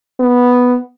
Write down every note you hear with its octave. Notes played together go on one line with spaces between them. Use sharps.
B3